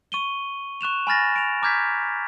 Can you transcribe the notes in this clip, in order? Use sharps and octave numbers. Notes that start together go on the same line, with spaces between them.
C#6 D#7 G7
C#6 F#6 E7 F7
G#5 B5 F6 A6 A#6
D7 F7
A#5 D6 F6 G6 G#6 B6